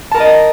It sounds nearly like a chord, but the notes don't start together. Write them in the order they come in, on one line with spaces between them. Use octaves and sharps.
A5 A#4 A#5 D#5